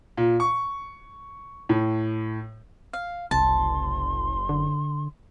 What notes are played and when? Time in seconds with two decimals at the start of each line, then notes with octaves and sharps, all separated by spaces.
0.17 A#2
0.40 C#6
1.69 A2
2.93 F5
3.31 F#1 C2 A5 C6
4.49 D3